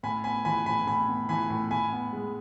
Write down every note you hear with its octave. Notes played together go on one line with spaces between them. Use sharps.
A2 G#5 B5
B3 G#5 B5
E3 G#5 B5
A2 G#5 B5
A2 G#5 B5
B3
E3 G#5 B5
A2
A2 G#5 B5
B3
G#3